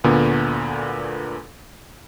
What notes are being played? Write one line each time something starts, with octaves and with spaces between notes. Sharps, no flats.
D2 A#2 D3 B3